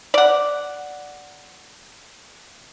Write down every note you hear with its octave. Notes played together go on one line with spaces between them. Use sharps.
D5 F#5